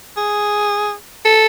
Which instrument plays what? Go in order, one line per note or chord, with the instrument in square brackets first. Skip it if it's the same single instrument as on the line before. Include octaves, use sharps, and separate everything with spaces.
[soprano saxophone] G#4
A4